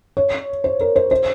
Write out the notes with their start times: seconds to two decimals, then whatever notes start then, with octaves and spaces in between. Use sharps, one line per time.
0.17 C#5
0.64 C5
0.81 A#4
0.96 C5
1.11 C5